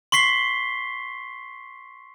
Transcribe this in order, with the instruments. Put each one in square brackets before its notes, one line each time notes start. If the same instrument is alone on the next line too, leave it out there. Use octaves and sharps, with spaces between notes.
[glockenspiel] C6 C#6 B6 C7 G7